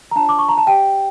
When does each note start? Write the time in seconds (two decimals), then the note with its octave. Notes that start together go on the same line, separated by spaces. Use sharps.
0.11 A#5
0.16 D4 F4 C#5 A5
0.29 D6
0.39 C#6
0.49 A#5
0.58 A5
0.67 G4 D5 G5